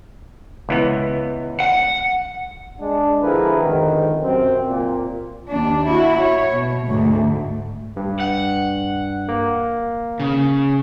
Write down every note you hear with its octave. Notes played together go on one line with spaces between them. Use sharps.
C#2 E3 B3
F#5
G#3 D4
D3 F3 E4 G#4 A#4 B4
F2 G#2 B2 D3 D#3
F#2 C3 C4
A#2
D#2 D4
E4 F#4
C#5
B2
D2 G#2
G2
F#5
A#3
C#3